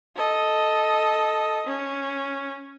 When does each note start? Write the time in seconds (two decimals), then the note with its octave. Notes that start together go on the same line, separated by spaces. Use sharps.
0.16 A4 D#5
1.67 C#4